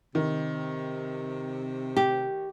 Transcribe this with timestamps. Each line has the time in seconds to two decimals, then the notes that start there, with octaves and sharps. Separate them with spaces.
0.15 C3 D#3
1.97 G4